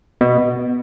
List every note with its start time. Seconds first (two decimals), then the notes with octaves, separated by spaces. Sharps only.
0.21 B2